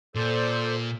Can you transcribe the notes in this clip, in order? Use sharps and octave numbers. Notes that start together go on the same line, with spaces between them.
A#2 A4 C5 D5